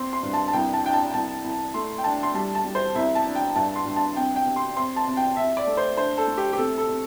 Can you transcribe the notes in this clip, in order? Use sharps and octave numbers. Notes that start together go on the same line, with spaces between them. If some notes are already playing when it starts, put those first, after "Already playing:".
Already playing: C4 C6
C6
G2
A5
A5
C2 G5
A5
D4 G5
A5
C2 A5
C2
A3 C6
G5
D4 A5
C6
G3 A5
A5
G3
C5
C2 E5
A5
D4
G5
G2 A5
C6
G2
A5
C3 G5
G5
C3
C6
C4 C6
A5
C3
G5
C3 E5
D5
A3
C5
D4 C5
A4
A3
G4
G4
C3 A4
A4
C3